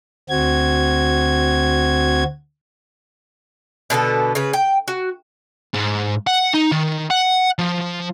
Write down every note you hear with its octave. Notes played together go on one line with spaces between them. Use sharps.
D2 C4 F#4 G#6
B2 D3 B3 A4
C#3 B4
G5
F#4
G#2
F#5
D#4
D#3
F#5
F3